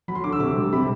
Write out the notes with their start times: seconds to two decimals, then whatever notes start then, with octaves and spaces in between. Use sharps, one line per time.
0.08 F#3 B5
0.15 C6
0.24 D3 D6
0.32 E6
0.40 C3 D6
0.57 G3
0.73 C3 B5